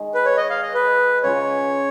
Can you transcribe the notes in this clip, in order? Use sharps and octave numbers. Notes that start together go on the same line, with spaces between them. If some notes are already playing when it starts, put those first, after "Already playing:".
Already playing: D#3 G#3 D#4
B4
C#5
D#5
F5
D#5
B4
C#3 G#3 C#4 F4 C#5